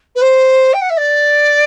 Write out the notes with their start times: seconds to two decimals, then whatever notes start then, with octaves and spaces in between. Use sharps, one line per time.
0.15 B4
0.21 C5
0.73 G5
0.81 F#5
0.89 E5
0.97 D5